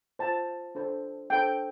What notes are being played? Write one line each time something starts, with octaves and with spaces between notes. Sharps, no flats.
F4 C5 A5
D4 A4 C5
D4 A4 C5 G5